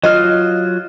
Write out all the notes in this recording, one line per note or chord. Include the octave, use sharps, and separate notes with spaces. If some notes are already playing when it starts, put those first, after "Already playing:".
F#3 F4 D#5 F6